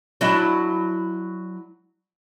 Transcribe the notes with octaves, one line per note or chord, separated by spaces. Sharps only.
F#3 D4 E4